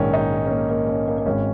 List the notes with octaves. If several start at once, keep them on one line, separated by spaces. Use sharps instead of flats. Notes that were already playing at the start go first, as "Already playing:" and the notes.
Already playing: A#1 G#2 D#3 C#4
D#4
C#4
A#3
A#3
C#4
A#3
A#3
G#1 G#2 D#3 C#4